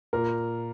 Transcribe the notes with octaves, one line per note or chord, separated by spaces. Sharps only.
A#2 A#4